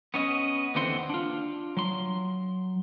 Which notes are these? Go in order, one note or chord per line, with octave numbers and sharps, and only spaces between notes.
B3 C#4 D#5
D#2 D3 E3 C4 F#5 C6
D4 F4
F#3 C6